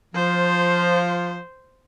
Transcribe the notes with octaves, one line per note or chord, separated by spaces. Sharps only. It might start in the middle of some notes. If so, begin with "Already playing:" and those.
F3 C5